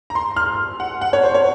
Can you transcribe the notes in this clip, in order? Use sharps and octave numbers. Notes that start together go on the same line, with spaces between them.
A#5
C6
F6
F#5
F#5
C#5
C5
C#5